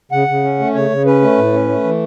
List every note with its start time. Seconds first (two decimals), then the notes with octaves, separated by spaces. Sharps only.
0.12 C#3 F#5
0.28 C#3
0.43 C#4
0.59 A3
0.74 C#3 C#5
0.90 C#3
1.06 C#4 B4
1.22 A3
1.38 A2
1.53 C#4
1.69 A3
1.84 E3